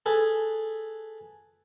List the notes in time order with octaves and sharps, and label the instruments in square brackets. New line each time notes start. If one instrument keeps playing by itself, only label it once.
[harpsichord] G#4 A4 B4 G#5